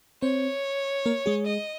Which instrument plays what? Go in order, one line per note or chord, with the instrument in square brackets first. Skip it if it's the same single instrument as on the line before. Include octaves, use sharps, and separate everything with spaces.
[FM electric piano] C4 C5 [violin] C#5
[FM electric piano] A#3 A#4
G#3 G#4
[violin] D#5